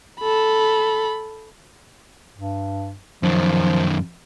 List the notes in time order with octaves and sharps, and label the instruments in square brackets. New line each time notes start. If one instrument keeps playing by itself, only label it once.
[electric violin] A4 B5
[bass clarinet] G2
[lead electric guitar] F#2 D#3 [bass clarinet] F3